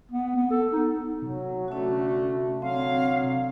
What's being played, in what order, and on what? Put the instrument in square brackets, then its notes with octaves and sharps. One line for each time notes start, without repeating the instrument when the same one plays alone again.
[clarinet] B3
B3
A4
D#4
[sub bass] C3 [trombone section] F#3
[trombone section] D3 A3 [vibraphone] C#4 F#4
[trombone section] D3 F#3 [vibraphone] C4 [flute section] F5